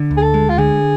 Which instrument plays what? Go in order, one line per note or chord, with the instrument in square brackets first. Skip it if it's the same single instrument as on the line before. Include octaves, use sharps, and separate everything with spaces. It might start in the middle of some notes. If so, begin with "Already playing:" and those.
Already playing: [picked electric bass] D3
D2
[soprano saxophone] G#4
A4
[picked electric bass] G#3
[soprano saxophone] F4
[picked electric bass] D3 [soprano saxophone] G#4